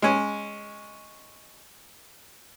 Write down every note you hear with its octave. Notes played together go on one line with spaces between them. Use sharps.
G#3 C#4